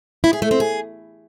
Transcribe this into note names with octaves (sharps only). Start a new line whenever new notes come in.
E4
G#4
A3
C4
G#4